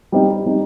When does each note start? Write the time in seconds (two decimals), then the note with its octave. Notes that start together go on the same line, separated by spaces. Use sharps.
0.12 G3 C4 D#4
0.46 G3 C4 D#4